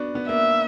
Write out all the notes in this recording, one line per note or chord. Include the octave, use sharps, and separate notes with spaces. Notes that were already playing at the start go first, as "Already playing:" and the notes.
Already playing: B3 D4 F#4
B3
A#3 E5